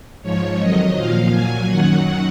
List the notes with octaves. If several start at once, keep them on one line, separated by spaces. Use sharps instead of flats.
G#2 F3 C#5
F2 D#3 F#3 D#5
A#2 F3 F5
A#2 F#3 G#5
F#2 D#3 F#3 F#5